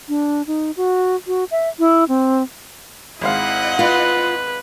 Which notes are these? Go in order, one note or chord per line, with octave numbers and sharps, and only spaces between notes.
D4
D#4
F#4
F#4
E5
E4
C4
G#1 G#3 E4 D#5 F5 F#5
F4 B4